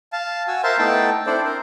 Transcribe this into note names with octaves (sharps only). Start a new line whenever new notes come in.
F5 A5
F#4 G#5 E6
A#4 C5 E5 F5 A5 C6
A3 B3 D#4 E4 G5 A5
C4 D4 E4 A4 C5 D5
A#4 C5